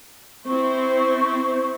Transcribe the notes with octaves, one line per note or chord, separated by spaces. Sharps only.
C4 E4 C5 C#6